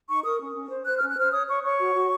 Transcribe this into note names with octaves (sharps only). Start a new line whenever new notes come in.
D#4 C#6
A#4 D#6
C#4
C#4
C5
C5 F#6
F6
C#4
F#6
C5 F6
C#5 D#6
C#5 C#6
C#5 C#6
F#4
F#4